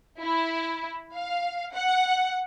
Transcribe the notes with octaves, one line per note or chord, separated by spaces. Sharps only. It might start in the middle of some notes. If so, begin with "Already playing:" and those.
E4
F5
F#5